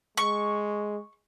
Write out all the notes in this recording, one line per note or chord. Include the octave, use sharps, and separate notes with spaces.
G#3 C#6